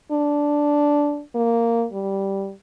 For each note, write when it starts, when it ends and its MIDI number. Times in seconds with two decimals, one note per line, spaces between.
0.12 1.22 62
1.35 1.85 58
1.93 2.52 55